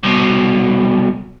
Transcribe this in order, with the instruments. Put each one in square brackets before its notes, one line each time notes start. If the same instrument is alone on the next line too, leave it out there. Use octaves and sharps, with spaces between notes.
[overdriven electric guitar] C2 B2